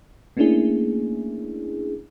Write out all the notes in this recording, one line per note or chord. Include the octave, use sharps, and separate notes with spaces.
A3 A#3 C#4 D4 E4 G#4